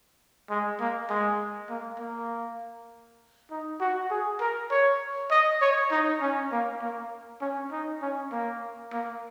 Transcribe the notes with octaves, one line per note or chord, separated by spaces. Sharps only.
G#3
A#3
G#3
A#3
A#3
D#4
F#4
G#4
A#4
C#5
D#5
C#5
D#4
C#4
A#3
A#3
C#4
D#4
C#4
A#3
A#3